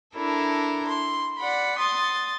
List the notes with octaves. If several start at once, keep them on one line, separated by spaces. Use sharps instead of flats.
D4 E4 A4 A#4
C6
D5 F#5 B5
C6 D#6 A6